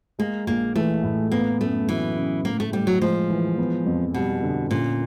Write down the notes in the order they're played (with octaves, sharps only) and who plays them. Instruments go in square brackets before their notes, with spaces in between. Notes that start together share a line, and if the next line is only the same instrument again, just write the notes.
[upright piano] G#3 [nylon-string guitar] A#3
[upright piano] A#1 [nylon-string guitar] A#3
[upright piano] E3 [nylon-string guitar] A3
[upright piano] A2
[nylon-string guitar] A#3 [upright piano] B3
[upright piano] F#2 [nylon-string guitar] A3
[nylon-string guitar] E3 [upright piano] F#3
[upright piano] C#3
[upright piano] A2 [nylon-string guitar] A#3
[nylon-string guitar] A3
[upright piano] A2 [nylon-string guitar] G3
[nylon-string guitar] F#3
[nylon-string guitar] F3 [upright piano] G#3
[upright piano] E3
B3
F2
[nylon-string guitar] B2 [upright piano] G3
[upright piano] D3
[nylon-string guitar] A#2 [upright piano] C#4